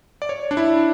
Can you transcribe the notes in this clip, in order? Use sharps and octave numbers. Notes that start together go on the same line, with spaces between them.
D5
C#5
D4
E4